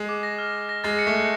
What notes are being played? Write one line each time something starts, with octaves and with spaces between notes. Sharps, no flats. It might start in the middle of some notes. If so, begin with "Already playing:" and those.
Already playing: G#3
D6
A#6
F6
D6
A#6
G#3 A6
C#7
A3
F#6